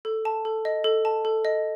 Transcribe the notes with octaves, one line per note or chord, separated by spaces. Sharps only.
A4
A5
A4
D#5
A4
A5
A4
D#5